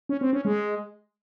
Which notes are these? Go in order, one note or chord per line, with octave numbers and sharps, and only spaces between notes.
C#4
C4
C#4
G#3